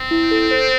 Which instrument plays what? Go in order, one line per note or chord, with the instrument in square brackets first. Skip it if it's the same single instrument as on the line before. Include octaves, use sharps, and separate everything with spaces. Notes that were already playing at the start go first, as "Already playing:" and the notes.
Already playing: [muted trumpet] C4
[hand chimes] E4
A4
C5